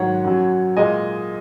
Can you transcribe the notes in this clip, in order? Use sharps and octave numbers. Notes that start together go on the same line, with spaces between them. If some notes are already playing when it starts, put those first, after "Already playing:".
Already playing: G#2 D#3 F#3 C#5 F#5
F#2 F#3
A#2 G#3 D#5 G#5